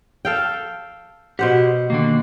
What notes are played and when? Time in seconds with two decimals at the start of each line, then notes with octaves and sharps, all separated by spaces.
0.25 A4 F5 G5
1.39 B2 G4 C5 F#5
1.90 D3 D#3 A#3